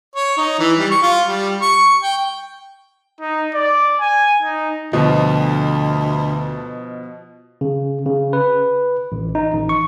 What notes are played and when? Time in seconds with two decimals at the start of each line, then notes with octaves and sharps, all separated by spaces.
0.16 C#5
0.38 D#4
0.59 E3
0.79 G3
0.91 C#6
1.02 F4
1.26 G3
1.62 C#6
2.03 G5
3.21 D#4
3.54 D5
4.01 G#5
4.42 D#4
4.93 D2 B2 F3 D#5
7.61 C#3
8.06 C#3
8.33 B4
9.12 A1
9.35 D#4
9.53 A1
9.69 C#6